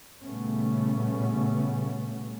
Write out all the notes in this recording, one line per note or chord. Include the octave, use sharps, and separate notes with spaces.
A#2 C#3 G3 A3 B3 C#4